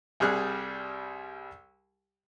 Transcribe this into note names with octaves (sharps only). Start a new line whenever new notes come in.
C2 G3 G#4 F6 F#6